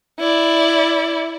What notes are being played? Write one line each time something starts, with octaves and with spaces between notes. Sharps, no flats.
E4 D5